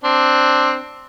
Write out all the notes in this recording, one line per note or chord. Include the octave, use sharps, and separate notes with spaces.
C4 D4